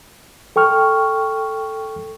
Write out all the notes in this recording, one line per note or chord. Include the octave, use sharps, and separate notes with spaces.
A4 G5 C#6 F6